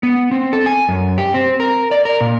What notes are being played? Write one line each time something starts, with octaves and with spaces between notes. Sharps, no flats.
B3
C4
A4
G#5
F#2
G4
C4
A#4
D5
A#4
A#2